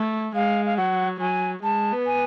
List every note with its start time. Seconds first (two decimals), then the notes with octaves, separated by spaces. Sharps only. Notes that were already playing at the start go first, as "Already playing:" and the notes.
Already playing: A3
0.35 G#3 F5
0.66 F5
0.77 F#3 F#5
1.20 F#3 G#5
1.63 G#3 A5
1.92 B3
2.06 G#5